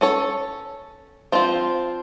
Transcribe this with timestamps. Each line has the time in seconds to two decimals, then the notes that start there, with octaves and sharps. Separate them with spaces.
0.01 C#4 A4 C#5
1.32 F3 C4 F4